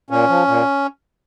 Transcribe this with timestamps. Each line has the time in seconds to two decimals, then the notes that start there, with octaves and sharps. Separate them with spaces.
0.10 A#2 C#4
0.29 F3
0.48 A#2